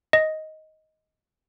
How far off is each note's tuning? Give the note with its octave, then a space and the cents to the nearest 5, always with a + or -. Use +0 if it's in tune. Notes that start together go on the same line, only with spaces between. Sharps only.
D#5 +10